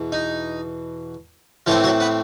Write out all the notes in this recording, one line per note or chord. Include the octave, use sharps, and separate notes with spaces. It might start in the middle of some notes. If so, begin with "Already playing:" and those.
Already playing: E2 B2
D#4
A2 E3 F3 A3 C4 F4
F#3 F#4
B3 B4